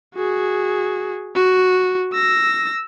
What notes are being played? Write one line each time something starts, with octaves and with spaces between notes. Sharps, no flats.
F#4 G#4
F#4
E6 A#6